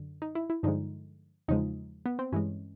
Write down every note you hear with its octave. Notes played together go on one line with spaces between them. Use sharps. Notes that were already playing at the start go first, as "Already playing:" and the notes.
Already playing: F#2 D3
D#4
E4
E4
G2 D3 F3 G#3 D#4
E2 C#3 F3 G#3 D#4
B3
C4
G2 E3 G#3 C#4